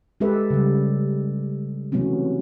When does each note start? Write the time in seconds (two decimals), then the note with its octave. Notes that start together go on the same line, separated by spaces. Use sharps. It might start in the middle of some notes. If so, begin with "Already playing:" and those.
0.20 G#3 G4 A4 B4 E5
0.50 C#3 G3
1.92 C3 E3 F#3 A3 B3 C#4